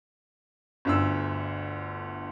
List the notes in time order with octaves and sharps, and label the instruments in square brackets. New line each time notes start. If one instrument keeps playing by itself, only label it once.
[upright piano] G1 D2 E6